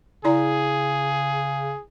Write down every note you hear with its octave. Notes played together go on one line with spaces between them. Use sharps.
C#3 E4 G#4 D5 A#5